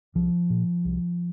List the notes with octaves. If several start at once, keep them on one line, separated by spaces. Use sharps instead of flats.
C2 F3
A#2
C2